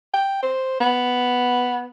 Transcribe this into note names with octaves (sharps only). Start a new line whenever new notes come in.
G5
C5
B3